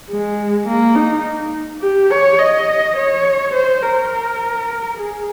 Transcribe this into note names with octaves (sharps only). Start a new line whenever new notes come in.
G#3
A#3
D#4
G4
C#5
D#5
C#5
C5
A#4
G#4